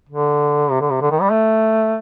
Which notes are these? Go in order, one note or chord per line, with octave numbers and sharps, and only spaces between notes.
D3
C3
D3
C3
D3
D#3
G3
A3